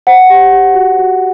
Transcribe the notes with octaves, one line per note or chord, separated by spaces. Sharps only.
C5 F#5
G4
G4
F#4
F#4